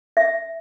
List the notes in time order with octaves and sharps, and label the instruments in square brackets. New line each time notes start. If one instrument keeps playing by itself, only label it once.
[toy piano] E5